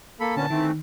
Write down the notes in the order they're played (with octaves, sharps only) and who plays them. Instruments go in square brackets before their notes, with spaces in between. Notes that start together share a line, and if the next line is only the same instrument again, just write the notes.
[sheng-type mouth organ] A#3 A4 B5
[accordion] A#2 B3 C#4 [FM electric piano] D3 [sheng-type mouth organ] A5
[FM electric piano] D#3 [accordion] E3 A3 C4 [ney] D#4